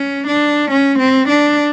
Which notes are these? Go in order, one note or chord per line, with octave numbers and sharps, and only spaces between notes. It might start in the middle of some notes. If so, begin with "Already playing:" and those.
Already playing: C#4
D4
C#4
C4
D4